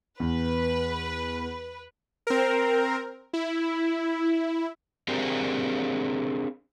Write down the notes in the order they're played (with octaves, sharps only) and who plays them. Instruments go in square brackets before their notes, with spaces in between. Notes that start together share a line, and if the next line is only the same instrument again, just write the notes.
[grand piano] E2 [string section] B4
[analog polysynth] C4 A#4
E4
[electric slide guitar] C4 D4 G4 G#4 A#4 C5